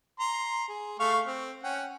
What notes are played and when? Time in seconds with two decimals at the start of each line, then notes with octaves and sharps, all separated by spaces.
0.19 A#5 C6
0.69 G#4
1.00 A3 F5 C#6
1.26 C4
1.63 C#4 F#5 G5